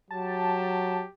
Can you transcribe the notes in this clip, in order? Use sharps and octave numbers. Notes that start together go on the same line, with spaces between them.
F#3 G4 A5